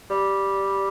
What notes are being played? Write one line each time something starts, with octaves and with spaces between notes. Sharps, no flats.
G3